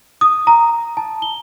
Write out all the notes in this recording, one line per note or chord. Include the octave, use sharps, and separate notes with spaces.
D#6
A#5
A5
G7